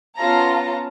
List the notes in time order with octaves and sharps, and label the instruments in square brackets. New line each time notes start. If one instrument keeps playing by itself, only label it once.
[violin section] B3 C#4 F4 A5 A#5